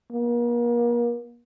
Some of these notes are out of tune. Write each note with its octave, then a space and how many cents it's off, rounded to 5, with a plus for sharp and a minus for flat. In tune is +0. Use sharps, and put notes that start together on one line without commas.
A#3 +40